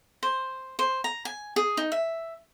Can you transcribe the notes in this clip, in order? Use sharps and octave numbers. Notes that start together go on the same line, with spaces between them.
C5
C5
A#5
G#5
G#4
D#4
E5